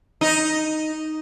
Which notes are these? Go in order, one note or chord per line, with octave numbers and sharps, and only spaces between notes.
D#4